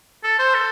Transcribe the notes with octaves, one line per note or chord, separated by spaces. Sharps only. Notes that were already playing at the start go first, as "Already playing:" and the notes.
A4
C5
A4